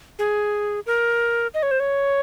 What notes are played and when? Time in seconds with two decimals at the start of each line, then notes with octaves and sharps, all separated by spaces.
0.19 G#4
0.86 A#4
1.54 D#5
1.63 C#5
1.71 C5
1.80 C#5